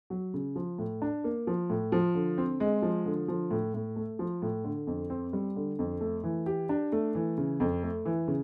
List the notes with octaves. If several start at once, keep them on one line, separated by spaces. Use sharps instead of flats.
F#3
C#3
F3
A2
D4
A#3
F3
A2
F3
D3
C4
G#3
F3
D3
F3
A2
A2
A3
F3
A2
D3
F2
C4
G3
D3
F2
A3
E3
G4
D4
A3
E3
C#3
F2
A3
E3
C#3